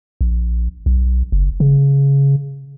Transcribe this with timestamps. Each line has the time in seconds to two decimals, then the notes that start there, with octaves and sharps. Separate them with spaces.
0.21 A#1
0.86 B1
1.32 F#1
1.60 C#3